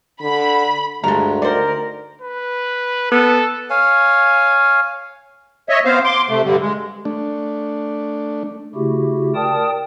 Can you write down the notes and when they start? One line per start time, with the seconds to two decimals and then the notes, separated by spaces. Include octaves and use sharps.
0.21 D3 B5
1.04 D2 G2 G#3 A4 A#5
1.42 D#3 A#4 C5 D5
2.22 B4
3.12 B3 A4
3.70 C#5 F5 G#5
5.69 C#5 D#5 E5
5.85 B3 C4 C5 F5
6.04 C6 D6
6.29 C3 A3
6.44 G2 D3 G3
6.61 G#3
7.05 A3 D4
8.75 C#3 A3 E4 F#4 G4
9.35 A#4 D5 G5 A5 D#6